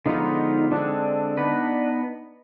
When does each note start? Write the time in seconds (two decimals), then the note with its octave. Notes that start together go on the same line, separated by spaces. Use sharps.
0.05 D3 F3 G#3 B3 D#4 F4
0.71 D3 G#3 C4 D4
1.37 B3 D#4 B4